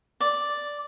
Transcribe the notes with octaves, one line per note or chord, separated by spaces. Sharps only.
D5